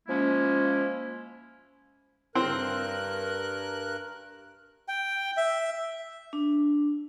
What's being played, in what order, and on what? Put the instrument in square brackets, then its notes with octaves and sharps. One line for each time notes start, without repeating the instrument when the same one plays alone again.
[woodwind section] F3 G#3 A#3 C#4 E4
[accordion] G2 A#4 F#6 [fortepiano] C4
[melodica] G5
E5
[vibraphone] D4